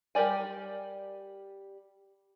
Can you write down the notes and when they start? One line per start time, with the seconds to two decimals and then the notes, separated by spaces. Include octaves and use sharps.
0.15 G3 G4 A#4 D5 G#5